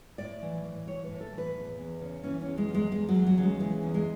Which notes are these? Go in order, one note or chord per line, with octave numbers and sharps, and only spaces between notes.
A2 D5
E3
E3
A2 C#5
B4
A2
A4
E3
B4
E2
E2
C#3
E3 C#4
C#4
E2
G#3
E2
G#3
E2 G#3
F#3
E2
F#3
C#3
G#3
E3 G#3
E2
G#3